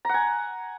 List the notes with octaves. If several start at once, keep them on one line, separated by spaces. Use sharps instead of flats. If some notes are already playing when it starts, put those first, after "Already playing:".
F#5 G#5 A#5